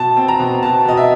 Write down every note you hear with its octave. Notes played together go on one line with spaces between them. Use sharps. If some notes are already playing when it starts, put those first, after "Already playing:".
Already playing: B2 A5
C4
A#5
B2
B2 A5
B2 D#5
E5